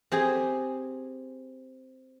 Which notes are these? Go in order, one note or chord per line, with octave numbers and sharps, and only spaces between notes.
C4 G4 G#4 G#5